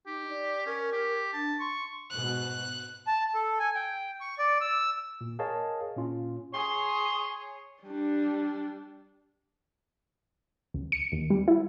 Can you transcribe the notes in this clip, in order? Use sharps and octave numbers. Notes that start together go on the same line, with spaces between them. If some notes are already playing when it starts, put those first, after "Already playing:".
D#4 G4
D5
C#4 A#4
G4
D4 A5
C6 C#6
G#2 B2 F#6
A5
A4
G#5
G5
C#6
D5
E6
A#2
G#4 A#4 C#5 D#5 F5 A5
A#2 C#4 F4
G#4 C#5 C6
G3 D4
C#2
C#7
D#2
G3
E4